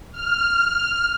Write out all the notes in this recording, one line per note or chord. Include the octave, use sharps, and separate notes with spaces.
F6